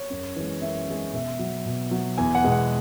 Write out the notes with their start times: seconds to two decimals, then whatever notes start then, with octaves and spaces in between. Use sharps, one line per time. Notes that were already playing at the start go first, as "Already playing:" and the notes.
Already playing: C#5
0.10 F#2
0.36 E3 G#3
0.62 F#2 E5
0.88 E3 G#3
1.13 B2 E5
1.39 F#3
1.66 B2
1.91 F#3
2.18 E2 G#5
2.35 F#5
2.44 B2 G#3
2.52 F#5